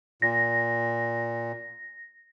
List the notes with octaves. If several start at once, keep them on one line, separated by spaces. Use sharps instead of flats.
A#2 A#6